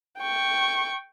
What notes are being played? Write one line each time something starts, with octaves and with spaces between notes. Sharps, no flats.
G5 C#6